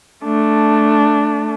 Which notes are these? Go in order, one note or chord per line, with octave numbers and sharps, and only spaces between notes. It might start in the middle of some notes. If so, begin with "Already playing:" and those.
A3 D4